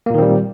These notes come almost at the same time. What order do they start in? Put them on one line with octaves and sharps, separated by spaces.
A#3 A#2 D#3 C4 G3